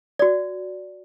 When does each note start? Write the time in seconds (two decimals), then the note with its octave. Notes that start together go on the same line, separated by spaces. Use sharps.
0.19 F#4 D5